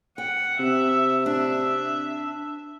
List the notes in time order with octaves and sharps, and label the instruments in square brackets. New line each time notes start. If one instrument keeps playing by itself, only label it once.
[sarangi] F#5 [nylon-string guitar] G5
[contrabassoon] C3 [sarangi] E5
[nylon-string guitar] D4 [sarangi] E5